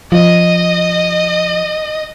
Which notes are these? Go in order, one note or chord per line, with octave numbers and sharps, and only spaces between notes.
F3 D#5